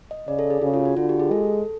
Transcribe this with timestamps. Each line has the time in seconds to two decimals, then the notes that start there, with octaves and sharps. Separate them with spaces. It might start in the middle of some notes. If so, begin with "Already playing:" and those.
0.11 D#5
0.28 C#3 D5
0.39 A4
0.50 G#4
0.62 C#3 F#4
0.74 F4
0.85 F#4
0.97 D3 F4
1.09 G4
1.20 G#4
1.31 G#3 A4